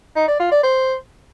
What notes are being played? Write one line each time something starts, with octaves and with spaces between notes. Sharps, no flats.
D#4
D5
F4
D5
C5